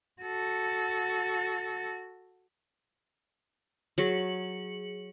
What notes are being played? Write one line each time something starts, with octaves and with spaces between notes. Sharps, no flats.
F#4 A4
F#3 G#4 C#7 F#7